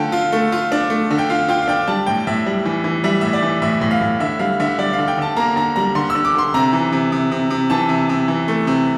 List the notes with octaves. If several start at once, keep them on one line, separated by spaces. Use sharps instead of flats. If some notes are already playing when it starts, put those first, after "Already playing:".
Already playing: D3 A3 F4 G5 A5
F4
A3
F4
D4
A3
D3
G5
F4 F5
F4 G5
F5
D4 G5
G3 A5
A2 G5
A2 E5
G3
E3
E3
G3 E5
A2 E5
D5
E3
A2 E5
A2
F5
A2
D3 E5
G3 F5
D3 E5
G3 D5
F5
D3
G5
D3 A5
A#3 A#5
D3 A#5
G3 A#5
D3 C6
D3 E6
D6
D3 C6
C3 A#5
E3
C3
C3
C3
C3
E3 A5
C3
C3
E3
A3
C3